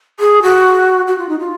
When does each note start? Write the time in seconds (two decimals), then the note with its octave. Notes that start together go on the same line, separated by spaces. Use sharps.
0.20 G#4
0.42 F#4
1.08 F#4
1.18 F4
1.29 D#4
1.39 F4